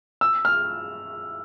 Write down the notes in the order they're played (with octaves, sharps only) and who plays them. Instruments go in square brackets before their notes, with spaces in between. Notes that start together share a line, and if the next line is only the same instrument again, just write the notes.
[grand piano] E6
F6